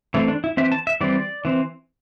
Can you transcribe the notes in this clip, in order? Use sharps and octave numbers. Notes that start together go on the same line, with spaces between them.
E3 A3 C4 E4
D4
E4
E3 C4 E5
A5
E5
E3 G3 C4 D5
E3 C4